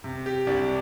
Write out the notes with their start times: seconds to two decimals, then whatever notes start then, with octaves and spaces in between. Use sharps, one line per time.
0.04 C3
0.26 G4
0.47 C2 D4